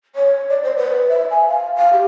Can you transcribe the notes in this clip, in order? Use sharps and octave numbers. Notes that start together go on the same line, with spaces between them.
C#5
D5
C5
B4
E5
G#5
F5
F5
G4